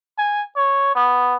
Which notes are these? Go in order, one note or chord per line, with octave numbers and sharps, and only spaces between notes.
G#5
C#5
B3